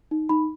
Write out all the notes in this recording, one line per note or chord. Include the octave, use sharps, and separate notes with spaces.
D#4
D#4 B5